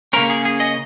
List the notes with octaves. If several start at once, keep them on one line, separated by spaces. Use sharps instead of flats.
C#3 A#3 C#4 A#4
G#4
G#4
D#5